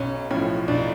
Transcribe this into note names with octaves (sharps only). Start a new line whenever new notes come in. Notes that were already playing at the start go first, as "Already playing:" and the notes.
Already playing: B1 C#4
A2 F3 C#4
B1 D4